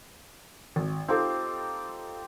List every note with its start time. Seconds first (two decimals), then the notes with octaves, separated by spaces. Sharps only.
0.76 G#1
1.08 C4 D#4 F4 G4 A4 D6